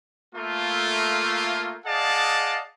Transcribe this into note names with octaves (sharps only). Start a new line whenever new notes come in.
A3 A#3 F4
G#4 D5 D#5 F5 F#5 A5